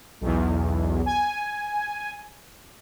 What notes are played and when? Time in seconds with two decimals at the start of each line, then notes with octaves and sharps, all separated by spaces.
0.21 B1 E2
1.06 G#5